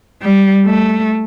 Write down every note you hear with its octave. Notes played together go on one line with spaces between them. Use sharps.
G3
A3